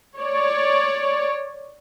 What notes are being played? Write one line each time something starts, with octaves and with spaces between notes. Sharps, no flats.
C#5 D5